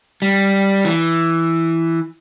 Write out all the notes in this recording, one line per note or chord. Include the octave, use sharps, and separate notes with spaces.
G3
E3